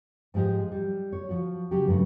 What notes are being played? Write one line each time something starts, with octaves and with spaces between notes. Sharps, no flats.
G#2 F3 G#3 G4 D#5
G3
C#5
F3 F#4
C#3 F#3 G#3 G4
G2 C#3 F#3 A3